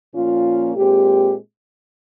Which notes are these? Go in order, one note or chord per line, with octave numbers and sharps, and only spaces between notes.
A#2 F3 A#3 C#4 F4
A#2 G#3 C4 G4